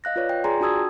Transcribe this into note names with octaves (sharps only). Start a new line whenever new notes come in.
D#5 F5 F#6 A#6
F4 B4 C#5 D5
G5
F4 G#4 D5 G#5 A#5 C6
D4 F#4 A5 D#6 E6 G#6
G5